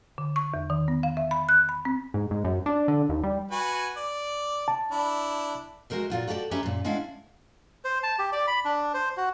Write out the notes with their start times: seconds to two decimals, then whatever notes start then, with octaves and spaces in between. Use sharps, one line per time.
0.18 D3
0.36 C#6
0.54 E2
0.70 D#3
0.88 B3
1.03 F5
1.17 E5
1.31 B5
1.49 F#6
1.69 B5
1.85 C4
2.14 G#2
2.31 G#2
2.44 F#2
2.66 D4
2.88 D3
3.09 D#2
3.24 G3
3.51 F#4 B4 G#5
3.97 D5
4.68 A5
4.91 D4 E4
5.90 G#3 F#4 A#4 C5 E5
6.10 A#2 F4 F#4
6.28 F#4 G4 A4 C5 D5
6.51 C#4 G4 B4 C5 E5 A#5
6.63 F#2 A#2
6.85 G#3 C#4 D4 E4 F5 F#5
7.85 C5
8.03 A5
8.19 G4
8.33 D5
8.48 B5
8.65 D4
8.94 C5
9.17 F#4